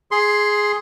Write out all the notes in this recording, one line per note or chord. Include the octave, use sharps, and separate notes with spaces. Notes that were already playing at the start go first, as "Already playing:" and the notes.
G#4 C6